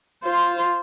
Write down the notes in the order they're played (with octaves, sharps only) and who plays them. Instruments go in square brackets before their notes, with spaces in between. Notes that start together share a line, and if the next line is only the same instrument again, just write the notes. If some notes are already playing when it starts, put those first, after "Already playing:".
[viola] F4 C5